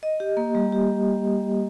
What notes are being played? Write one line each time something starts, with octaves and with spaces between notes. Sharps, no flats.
D#5
G4
A#3
G3
G4